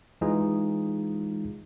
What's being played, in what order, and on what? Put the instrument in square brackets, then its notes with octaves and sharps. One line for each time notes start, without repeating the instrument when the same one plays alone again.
[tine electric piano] E3 G#3 D#4 F4 G#4